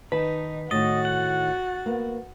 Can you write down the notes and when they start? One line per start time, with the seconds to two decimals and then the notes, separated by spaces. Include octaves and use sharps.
0.12 D#3 D#4 B4 A5
0.71 A2 D#3 F#4 D#5 A6
1.05 F#5
1.86 A#3 B3